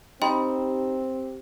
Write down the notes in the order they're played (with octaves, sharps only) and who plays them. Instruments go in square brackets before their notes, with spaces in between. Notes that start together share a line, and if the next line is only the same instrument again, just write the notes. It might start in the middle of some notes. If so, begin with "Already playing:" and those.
[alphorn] C4 [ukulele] D#4 B5 [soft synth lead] G4 [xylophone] D#5 G5 C6